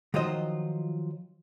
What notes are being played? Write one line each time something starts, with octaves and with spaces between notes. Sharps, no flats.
D#3 F3 F#3 F4 C5 D#5